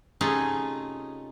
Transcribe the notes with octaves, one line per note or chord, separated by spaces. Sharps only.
C3 A3 C#4 D#4 F4 G#4